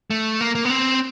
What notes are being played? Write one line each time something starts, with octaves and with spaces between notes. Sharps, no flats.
A3
A#3
A#3
B3
C4